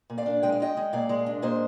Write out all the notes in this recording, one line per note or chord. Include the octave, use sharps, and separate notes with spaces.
A#2
D5 F5
D4
G#3 G5
F5
G#3 D#5 G5
G#3
A#2 D5 F5
G#3
D4
A#2 C5 D#5